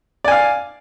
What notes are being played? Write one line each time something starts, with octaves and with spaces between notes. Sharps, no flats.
D5 F5 G#5